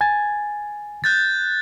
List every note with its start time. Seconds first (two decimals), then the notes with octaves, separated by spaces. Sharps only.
0.01 G#5 G#6 A6
1.04 F#6 G6 A6